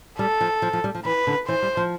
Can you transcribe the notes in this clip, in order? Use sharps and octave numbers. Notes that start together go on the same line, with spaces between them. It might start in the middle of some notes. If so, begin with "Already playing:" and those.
G3 A4
F3
F3
F3
G3
F3
E3 B4
D3
E3 C5
G3
F3